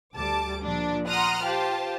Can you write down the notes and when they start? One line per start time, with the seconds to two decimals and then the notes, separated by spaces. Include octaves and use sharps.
0.15 D2 G3 A5 D6
0.63 A#2 F3 D4
1.08 F#5 A#5 C6 D#6 F6 F#6
1.44 F4 G4 C5 A5